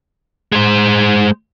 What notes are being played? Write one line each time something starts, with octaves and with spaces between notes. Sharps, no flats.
G#3 C5